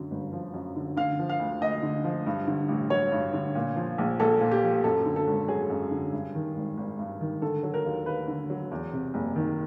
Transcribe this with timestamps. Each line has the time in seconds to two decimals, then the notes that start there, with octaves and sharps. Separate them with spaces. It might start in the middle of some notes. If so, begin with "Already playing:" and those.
Already playing: F#2 D3
0.11 G1
0.33 F3
0.54 F#2
0.76 D3
0.97 D3 F5
1.19 F3
1.29 F5
1.40 D2
1.61 D2 D#5
1.82 D3
2.04 F3
2.27 G2
2.47 D3
2.69 A1
2.90 F#3 C#5
3.12 G2
3.33 D3
3.55 A#2
3.76 F3
3.98 A#1
4.20 A#1 A4
4.41 A#2
4.51 G4
4.63 F3
4.84 F#2 A4
5.06 D3
5.16 A4
5.27 G#1
5.48 F#3 G#4
5.70 F#2
5.91 D3
6.13 G2
6.35 D#3
6.56 G#1
6.77 G#1
6.99 G2
7.21 D#3
7.42 D3 A4
7.63 F#3
7.74 A#4
7.85 D#2
8.06 D#2 B4
8.28 D3
8.50 F#3
8.71 E2
8.93 C3
9.14 F#1
9.36 D#3